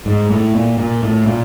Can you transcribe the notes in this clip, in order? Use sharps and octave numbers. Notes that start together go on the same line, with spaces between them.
G#2
A2
A#2
A#2
A2
A#2